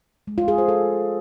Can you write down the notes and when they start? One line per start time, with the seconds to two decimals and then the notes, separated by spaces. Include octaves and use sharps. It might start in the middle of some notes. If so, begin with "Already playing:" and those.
0.27 G#3
0.38 F4
0.48 G#4
0.58 C5
0.68 A4